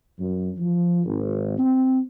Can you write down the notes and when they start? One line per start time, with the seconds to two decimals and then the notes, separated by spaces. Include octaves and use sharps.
0.18 F#2
0.58 F3
1.04 G#1
1.58 C4